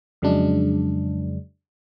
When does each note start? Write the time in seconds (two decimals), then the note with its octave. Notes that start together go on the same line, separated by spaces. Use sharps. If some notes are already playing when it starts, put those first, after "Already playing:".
0.22 F2 C#3 F#3 G#3 D4